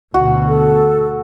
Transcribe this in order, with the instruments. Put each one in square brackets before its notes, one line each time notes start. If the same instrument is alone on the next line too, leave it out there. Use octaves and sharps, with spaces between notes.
[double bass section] D2 B2 [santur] F#4
[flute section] A4